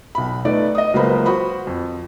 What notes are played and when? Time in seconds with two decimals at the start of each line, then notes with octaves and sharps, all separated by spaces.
0.15 B1 B5
0.45 A3 B3 D#4 D5
0.75 D#5 D#6
0.94 C#2 F#3 A#3 B3 C5 B5
1.25 F#4 C5 B5 D#6
1.67 F2